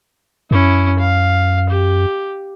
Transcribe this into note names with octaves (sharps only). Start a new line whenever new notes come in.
F#2 C#4 E4
F5
G4